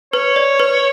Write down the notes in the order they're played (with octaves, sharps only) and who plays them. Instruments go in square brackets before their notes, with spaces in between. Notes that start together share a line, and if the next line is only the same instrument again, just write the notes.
[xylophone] B4 [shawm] C#5
[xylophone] D5
B4